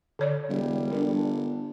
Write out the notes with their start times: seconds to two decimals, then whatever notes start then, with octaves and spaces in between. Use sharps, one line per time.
0.19 D3 C#5 D5
0.49 E1 G3
0.92 G1 A#4
1.15 D4